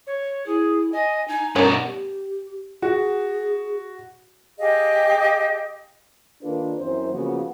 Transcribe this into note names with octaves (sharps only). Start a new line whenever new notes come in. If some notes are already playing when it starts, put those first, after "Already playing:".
C#5
E4 G#4
D#5 G#5
D#4 G#5
G2 B2 C#4 A#4 F#5
G4
F#4 G#4
G4 G#4 D#5 F5
D#3 A#3 D4 F4 A4 B4
F#2 E3 C4 C5
C#3 F3 A#3 B3 F#4